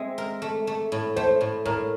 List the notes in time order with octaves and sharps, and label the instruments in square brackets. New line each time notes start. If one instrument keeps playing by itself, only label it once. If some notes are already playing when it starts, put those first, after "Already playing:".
Already playing: [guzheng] G#3 C4 [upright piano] E5
[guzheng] A#4
A3
A3
A2
[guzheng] A3 [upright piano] C5
[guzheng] A2
[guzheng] A2 [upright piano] A#4